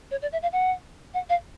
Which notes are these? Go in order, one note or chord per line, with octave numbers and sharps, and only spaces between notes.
C#5
D5
E5
F5
F#5
F#5
F5